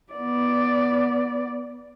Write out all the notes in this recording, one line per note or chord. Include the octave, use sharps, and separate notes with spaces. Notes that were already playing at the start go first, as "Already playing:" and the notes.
B3 D5